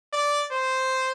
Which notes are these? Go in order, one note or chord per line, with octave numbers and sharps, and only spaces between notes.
D5
C5